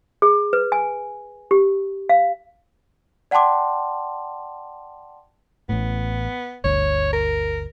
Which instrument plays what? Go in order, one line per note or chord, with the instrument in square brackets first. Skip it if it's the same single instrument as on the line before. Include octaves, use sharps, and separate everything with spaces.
[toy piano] G#4
B4
G#5
G4
F5
[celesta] D5 F#5 G5 A5 C6 D6
[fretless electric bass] A1 A2 [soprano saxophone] B3
[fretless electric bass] G1 D2 [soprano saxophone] C#5
[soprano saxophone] A#4